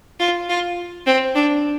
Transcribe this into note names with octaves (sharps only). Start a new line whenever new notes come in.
F4
F4
C4
D4